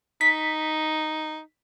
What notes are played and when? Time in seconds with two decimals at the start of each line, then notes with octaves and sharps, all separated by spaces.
0.21 D#4 B6